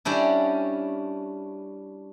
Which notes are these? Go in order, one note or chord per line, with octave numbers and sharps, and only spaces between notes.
G3 C#4 D4 E4